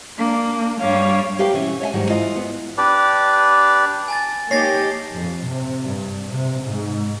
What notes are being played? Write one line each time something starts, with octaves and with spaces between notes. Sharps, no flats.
A#3 D4
G2 G3 C#5 F5
A#3 G4 B4 F5 G5
B2 E3 C#4
C#5 D#5 E5 G#5
G#2 D#3 F#3 G3
E3 F4 D#5
B3
D4 G4 B4 D5
G#5 A5 A6
A#3 D#4 G4 C#5 A6 A#6 C7
F2
C3
G2
C3
G#2